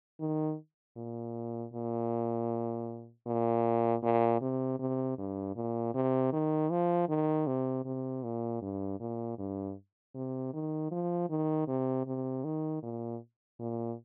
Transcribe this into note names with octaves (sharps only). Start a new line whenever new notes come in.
D#3
A#2
A#2
A#2
A#2
C3
C3
G2
A#2
C3
D#3
F3
D#3
C3
C3
A#2
G2
A#2
G2
C3
D#3
F3
D#3
C3
C3
D#3
A#2
A#2